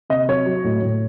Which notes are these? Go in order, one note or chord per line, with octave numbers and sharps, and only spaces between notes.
C3 D#5
F#3 C#5
F#3
A2
A2